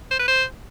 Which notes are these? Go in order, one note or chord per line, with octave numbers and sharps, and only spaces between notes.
C5
B4
C5